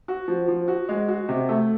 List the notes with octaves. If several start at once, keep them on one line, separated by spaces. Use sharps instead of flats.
F#4
F3
F3
F#4
G#3
F#4
C3
A3